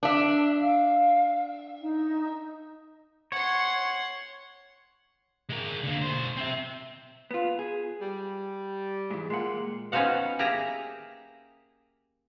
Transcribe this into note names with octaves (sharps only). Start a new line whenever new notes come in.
D4 E5
F5
D#4
C#5 F#5 C6
G#3 A#4
D3 A#3
B1 C5
C4 E5
B3 F4
G#4
G3
G#2 E3
A#2 G#3 F#5
B3 C#4 D#4 C5 F5 F#5
A#3 G4 G#4 E5 A#5